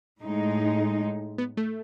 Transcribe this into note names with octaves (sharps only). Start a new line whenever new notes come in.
A2 G#3 D#4
B3
A3